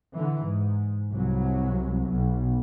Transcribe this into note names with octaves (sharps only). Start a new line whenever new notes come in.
D3 E3
G#2
C2 F#3
B1